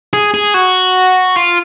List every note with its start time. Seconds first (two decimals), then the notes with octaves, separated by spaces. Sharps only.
0.13 G#4
0.34 G#4
0.54 F#4
1.36 F4